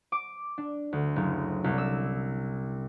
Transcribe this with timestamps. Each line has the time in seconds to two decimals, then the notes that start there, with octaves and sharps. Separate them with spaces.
0.12 D6
0.58 D4
0.93 D2
1.16 F#1
1.64 C2
1.78 E6